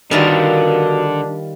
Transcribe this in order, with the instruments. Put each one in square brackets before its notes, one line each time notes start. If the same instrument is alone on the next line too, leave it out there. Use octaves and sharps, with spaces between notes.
[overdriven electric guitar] D3 [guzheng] D#3 G3 F4 [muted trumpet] D4 [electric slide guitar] F#4 A#4 B4